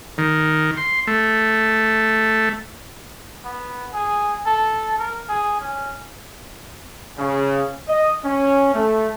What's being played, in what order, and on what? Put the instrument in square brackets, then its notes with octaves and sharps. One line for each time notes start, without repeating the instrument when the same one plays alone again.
[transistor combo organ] D#3
C6
A3
[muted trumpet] B3
G#4
A4
A#4
G#4
C#4
[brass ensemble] C#3
D#5
C#4
A3